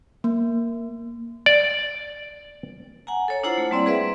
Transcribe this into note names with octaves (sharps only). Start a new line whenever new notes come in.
A#3
D5
F#5 G#5 A#5
A4 C#5
D4 E4 F4 C5 F#5 A#5
A3
G3 A#3 C4 E4 D5
G#4 B4 D5 E5